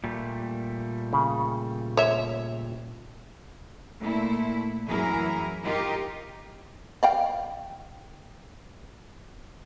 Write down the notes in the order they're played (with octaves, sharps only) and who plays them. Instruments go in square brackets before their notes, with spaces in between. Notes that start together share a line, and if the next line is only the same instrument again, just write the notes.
[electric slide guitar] A#2 G3 A3
[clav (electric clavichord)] C#3
[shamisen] C#5 E5
[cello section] A#2 A3 E4
F#2 E3 E4 G#4 A#4
D#4 F4 G4 A#4
[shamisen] D5 F5 G5